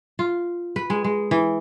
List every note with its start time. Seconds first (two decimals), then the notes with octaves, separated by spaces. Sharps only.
0.19 F4
0.76 B4
0.90 G#3
1.04 G#3
1.31 E3